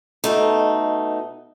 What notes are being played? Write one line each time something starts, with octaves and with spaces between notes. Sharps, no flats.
B2 A3 D#4